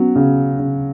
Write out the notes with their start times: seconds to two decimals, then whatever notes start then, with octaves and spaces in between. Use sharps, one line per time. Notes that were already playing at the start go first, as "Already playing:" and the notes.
Already playing: F#3 B3 C#4
0.15 C#3
0.59 C#3